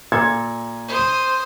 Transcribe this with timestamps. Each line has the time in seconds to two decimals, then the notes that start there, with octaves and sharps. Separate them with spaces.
0.12 A#2 A4 G#6
0.88 C5 D#6